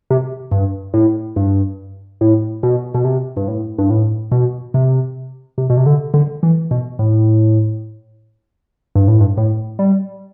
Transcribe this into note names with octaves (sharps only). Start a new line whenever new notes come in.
C3
G2
A2
G2
A2
B2
B2
C3
G2
A2
G2
A2
B2
C3
C3
B2
C3
D3
D3
E3
B2
A2
G2
A2
G2
A2
G3